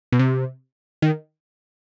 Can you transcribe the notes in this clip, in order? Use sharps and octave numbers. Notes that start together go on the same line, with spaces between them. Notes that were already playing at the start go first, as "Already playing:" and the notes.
B2
C3
D#3